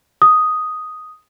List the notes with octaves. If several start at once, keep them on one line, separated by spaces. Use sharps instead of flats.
D#6